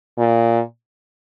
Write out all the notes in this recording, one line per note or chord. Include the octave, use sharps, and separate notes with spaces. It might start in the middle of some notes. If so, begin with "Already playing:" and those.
A#2